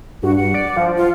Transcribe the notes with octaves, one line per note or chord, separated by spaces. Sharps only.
G2 F#4
F#5
D5
F3
F4